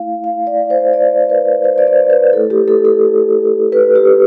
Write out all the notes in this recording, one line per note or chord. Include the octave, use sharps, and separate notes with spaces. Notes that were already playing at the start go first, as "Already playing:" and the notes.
Already playing: A3 E4 F5
F5
D5
C5
D5
B4
C5
D5
C5
B4
A3 E4 A4
G4
A4
A4
B4
G4